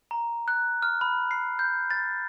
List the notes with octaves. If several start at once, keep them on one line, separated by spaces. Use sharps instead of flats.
A#5
F#6
F6
B5
C7
G6
A6